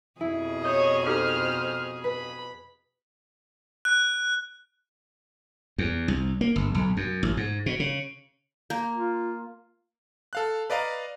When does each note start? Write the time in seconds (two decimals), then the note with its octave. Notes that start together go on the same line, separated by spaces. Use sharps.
0.21 F2 B2 E4 G#4
0.62 C#5 D#5 D#6 G6
1.07 D#4 G4 A4 C5 F6
2.04 B4 B5
3.85 F#6
5.78 E2
6.08 C2
6.41 A#3
6.56 G1
6.75 B1
6.97 F#2
7.23 A1
7.37 G#2
7.66 B2
7.80 C#3
8.70 A#3
8.94 F4
10.33 A4 F5 F#6
10.70 B4 D5 D#5 F5 A#5